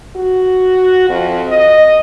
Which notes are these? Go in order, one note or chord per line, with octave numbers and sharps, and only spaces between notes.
F#4
F2
D#5